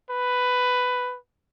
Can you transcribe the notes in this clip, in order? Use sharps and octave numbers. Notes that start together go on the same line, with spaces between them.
B4